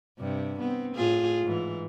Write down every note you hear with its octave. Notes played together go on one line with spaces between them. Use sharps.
G2 C3
B3 C4
A2 F4 G#4
G#2 E3